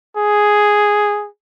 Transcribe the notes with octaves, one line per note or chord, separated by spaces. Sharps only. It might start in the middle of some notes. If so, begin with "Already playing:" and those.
G#4